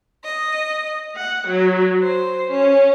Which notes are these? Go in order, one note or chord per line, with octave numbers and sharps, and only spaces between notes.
D#5
F#5
F#3
C5
C#4